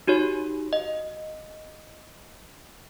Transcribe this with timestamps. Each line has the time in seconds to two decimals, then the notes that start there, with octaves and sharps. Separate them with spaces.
0.07 D#4 F#4 G4 C#5
0.73 D#5 F5